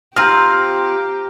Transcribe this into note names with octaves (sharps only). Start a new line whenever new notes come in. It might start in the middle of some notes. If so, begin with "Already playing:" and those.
C4 F4 G4 A#5 F6